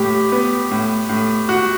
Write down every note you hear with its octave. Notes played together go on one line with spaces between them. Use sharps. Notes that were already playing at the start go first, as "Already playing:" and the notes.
Already playing: A2 G4
B3
A2
A2
F#4